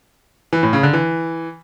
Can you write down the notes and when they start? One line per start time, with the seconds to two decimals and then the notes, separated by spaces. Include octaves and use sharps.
0.53 E3
0.63 A2
0.73 C#3
0.83 D3
0.93 E3